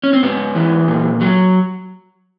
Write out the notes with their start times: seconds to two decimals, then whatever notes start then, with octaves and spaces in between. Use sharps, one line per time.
0.04 C#4
0.13 C4
0.23 G#2 B3
0.55 E3
0.88 A#2
1.21 F#3